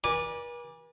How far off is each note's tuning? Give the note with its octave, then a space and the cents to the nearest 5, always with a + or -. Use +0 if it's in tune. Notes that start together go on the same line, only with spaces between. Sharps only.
B4 -45 D5 +0 G#5 -25